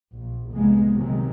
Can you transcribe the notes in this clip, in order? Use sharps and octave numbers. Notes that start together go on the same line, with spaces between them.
A#1
C2 F2 A2 G#3 A#3 B3
C3 D#3 F#3 G#3